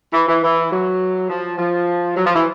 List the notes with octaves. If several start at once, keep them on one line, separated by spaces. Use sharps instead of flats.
E3
E3
E3
F#3
F3
F3
F#3
F3
E3